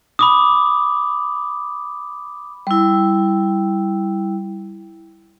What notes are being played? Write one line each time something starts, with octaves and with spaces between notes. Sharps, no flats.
B5 D6 D#6
G3 E4